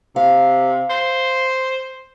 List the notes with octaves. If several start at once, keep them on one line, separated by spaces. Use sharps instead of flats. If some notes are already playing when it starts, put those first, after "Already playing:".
C3 F5
C5